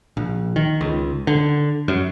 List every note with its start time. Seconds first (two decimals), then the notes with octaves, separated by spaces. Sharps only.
0.17 A#1
0.56 D#3
0.81 C#2
1.27 D3
1.88 F#2